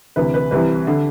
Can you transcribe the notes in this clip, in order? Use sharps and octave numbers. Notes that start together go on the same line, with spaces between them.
D2 C3 E3 B4
B4
C2 C3 E3 B4
D3